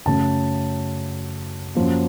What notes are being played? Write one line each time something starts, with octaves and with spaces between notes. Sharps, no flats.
F#2 C#3 A3 A5
F#2 F3 A#3